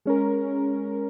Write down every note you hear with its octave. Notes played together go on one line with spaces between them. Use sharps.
G#3 C#4 A#4